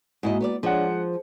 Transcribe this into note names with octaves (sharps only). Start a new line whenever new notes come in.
G#2 G#3 A#3 E4 F#4 D#5
B3 C#5 D5
F3 G#3 D4 C#5 D5 F#5
G#4 C5